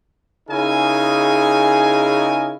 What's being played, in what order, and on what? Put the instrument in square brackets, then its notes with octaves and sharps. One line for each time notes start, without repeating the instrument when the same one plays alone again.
[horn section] C#3 D#4 E4 G#4 A#4 G#5